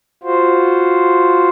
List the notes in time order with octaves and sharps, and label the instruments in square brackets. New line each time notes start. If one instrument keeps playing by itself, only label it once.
[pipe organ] F4 F#4 C5